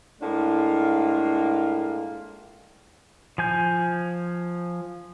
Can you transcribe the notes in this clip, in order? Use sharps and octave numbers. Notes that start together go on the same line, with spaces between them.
A2 G#3 A#3 D4 F4
F3 G#5 G6